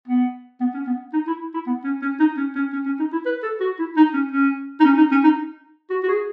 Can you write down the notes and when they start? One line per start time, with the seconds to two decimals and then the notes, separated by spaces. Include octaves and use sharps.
0.07 B3
0.60 B3
0.74 C#4
0.87 B3
1.13 D#4
1.27 E4
1.54 E4
1.66 B3
1.84 C#4
2.02 C#4
2.20 D#4
2.37 C#4
2.55 C#4
2.72 C#4
2.86 C#4
2.99 D#4
3.12 E4
3.26 B4
3.43 A4
3.60 F#4
3.79 E4
3.97 D#4
4.13 C#4
4.31 C#4
4.80 D#4
4.84 C#4
4.97 D#4
5.11 C#4
5.24 D#4
5.90 F#4
6.03 F#4
6.09 G#4